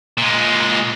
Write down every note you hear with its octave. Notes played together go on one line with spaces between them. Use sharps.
A#2 G#3